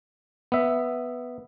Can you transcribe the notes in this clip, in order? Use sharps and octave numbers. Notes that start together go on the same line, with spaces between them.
B3 E5